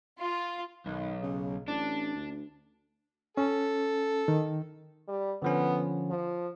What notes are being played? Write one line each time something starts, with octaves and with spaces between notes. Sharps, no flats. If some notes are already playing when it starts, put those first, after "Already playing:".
F4
B1 D#3
C#3
A1 D4
D2
C#4 A4
D#3
G3
D3 F3 B3 C#4
F3